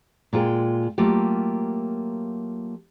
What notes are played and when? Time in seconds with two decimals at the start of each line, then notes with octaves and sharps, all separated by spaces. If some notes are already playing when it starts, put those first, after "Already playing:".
0.33 A#2 G#3 F4 C5 G5
0.98 F#3 A3 A#3 F4 G4